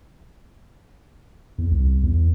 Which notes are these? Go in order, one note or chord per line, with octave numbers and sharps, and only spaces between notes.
E2
C2
E2